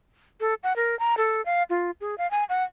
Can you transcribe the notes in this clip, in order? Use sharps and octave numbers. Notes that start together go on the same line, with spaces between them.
A4
F#5
A#4
A#5
A4
F5
F4
G#4
F5
G#5
F#5